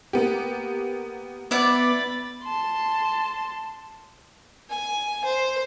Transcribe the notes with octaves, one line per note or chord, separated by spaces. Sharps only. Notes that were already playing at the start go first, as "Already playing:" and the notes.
A#3 B3 G4
B3 E4 D5 F#5 B5 A6
A5 C6
G#5
C5